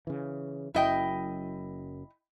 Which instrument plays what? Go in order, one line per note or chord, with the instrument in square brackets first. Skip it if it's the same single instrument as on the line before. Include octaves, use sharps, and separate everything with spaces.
[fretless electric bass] C#3 E3
[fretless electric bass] F#1 F#2 [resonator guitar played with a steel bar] E4 D#5 G5